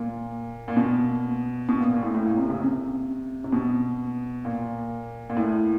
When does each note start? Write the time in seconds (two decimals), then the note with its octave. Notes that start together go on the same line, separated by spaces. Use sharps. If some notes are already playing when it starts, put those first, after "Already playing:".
Already playing: A#2
0.68 A#2
0.77 B2
1.69 B2
1.80 A#2
1.92 A#2
2.03 A2
2.15 A2
2.27 A#2
2.38 C3
2.49 C#3
2.61 C3
3.44 C3
3.52 B2
4.45 A#2
5.30 A#2
5.37 A2